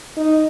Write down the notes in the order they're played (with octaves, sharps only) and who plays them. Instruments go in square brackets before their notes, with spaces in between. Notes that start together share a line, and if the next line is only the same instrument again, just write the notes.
[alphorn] D#4